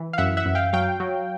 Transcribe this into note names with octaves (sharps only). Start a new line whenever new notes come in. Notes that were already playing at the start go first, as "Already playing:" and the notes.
Already playing: E3
F5
F#2 E5 F#5
E5 F#5
F#2
F5 G5
F#3 F5 G5
F#3